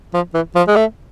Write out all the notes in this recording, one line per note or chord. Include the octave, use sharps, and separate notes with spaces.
F3
E3
F3
G#3
A3